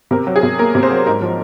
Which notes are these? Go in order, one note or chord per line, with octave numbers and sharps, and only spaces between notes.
C3 A#4
F#3
G#4
C3
A#3 A#4
C3
C5
F#3
G#2 A#4
F3